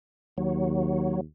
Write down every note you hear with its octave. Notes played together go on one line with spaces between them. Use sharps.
D#2 F#3